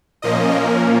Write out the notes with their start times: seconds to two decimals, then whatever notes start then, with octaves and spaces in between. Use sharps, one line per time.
0.22 A#2 F3 A#3 C#4 D#5
0.51 A#4